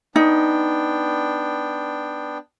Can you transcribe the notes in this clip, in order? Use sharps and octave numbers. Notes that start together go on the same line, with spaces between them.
B3 D4 D#4 G5